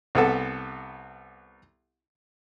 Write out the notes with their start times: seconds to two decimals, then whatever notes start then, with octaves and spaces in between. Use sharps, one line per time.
0.15 C2 B3 A4